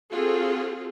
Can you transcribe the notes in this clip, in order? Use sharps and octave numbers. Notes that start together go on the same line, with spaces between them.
C4 F4 F#4 G#4 A4